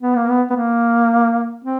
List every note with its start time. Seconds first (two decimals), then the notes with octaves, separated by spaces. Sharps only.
0.02 B3
0.16 A#3
0.29 B3
0.50 B3
0.56 A#3
1.65 C4